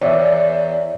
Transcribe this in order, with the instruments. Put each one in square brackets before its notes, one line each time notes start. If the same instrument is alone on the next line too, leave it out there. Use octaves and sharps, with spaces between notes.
[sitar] E2 [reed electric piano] C#5 D5 E5